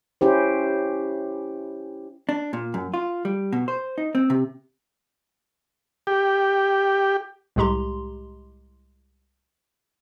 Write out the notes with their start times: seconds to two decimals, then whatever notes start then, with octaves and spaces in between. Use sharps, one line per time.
0.21 C#4 E4 G4 C5
2.29 D4
2.53 A#2
2.74 F#2
2.94 F4
3.25 G3
3.52 B2
3.68 C5
3.98 D#4
4.15 C4
4.30 C3
6.07 G4
7.56 C2 A2 G#3 G4 A#5 C6